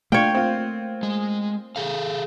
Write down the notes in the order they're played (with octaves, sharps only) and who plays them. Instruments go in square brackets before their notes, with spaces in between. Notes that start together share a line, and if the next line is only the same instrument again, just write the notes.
[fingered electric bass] A3 A#3 [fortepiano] D4 F4 F5 [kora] C#5 G5
[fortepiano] C4 F4
[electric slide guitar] G#3
G#4 A4 F5